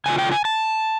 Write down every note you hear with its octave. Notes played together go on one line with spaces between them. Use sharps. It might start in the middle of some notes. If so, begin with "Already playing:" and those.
C#3 E3 A3 D4 F4 G#5
G5
G#5
A5